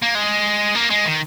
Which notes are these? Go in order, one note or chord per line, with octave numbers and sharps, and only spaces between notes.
A#3
G#3
A#3
G#3
D#3